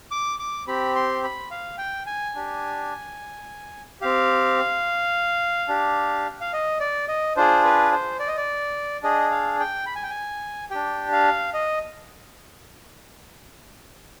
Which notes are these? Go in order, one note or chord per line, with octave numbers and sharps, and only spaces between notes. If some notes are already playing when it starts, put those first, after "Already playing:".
D6
D6
C4 G4 B5
C6
B5
F5
G5
G#5
D4 G4
C4 G4 F5
D4 G4
F5
D#5
D5
D#5
D4 F4 G#4 C5
B4
C5
D5
D#5
D5
D4 G#4 D#5
F5
G5
B5
G#5
G5
G#5
D4 G4 G5
F5
D#5